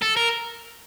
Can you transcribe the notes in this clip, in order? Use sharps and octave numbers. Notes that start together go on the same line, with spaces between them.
A4
A#4